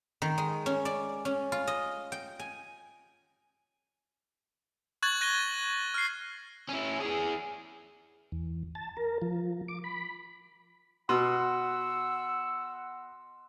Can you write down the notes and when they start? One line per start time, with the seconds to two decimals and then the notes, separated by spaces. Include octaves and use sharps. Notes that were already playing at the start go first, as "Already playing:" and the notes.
0.22 D#3
0.38 G#3
0.66 C#4
0.85 D5
1.25 C#4
1.52 F4
1.67 D#5
2.12 G5
2.39 G#5
5.03 C#6 F#6 G#6 A6 F#7
5.21 F#6 A#6 D#7 F#7 G7
5.94 F6 C7
6.69 C#4 E4
7.00 E3 G#4
8.32 E2
8.75 A5
8.97 A#4
9.22 F3
9.68 D6
9.84 B5
11.09 B2 F#5 C6 E6